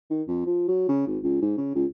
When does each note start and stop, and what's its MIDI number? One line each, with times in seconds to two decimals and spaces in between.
0.10 0.22 51
0.27 0.45 41
0.46 0.64 53
0.68 0.84 54
0.89 1.02 49
1.07 1.18 32
1.23 1.38 37
1.42 1.56 44
1.57 1.72 49
1.75 1.85 37